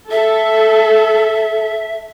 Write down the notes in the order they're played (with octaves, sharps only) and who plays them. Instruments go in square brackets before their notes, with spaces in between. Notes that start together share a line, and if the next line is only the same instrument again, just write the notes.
[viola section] A4 [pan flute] E5